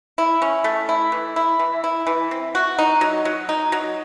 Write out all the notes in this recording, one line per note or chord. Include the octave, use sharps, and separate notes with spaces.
E4
C#4
A3
E4
E3
E4
E3
E4
E3
C4
F#4
D#4
F#3
F#3
D#4
F#3